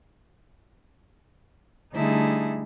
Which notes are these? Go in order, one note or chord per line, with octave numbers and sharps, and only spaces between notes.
D3 G3 A3 D#4 E4 G#4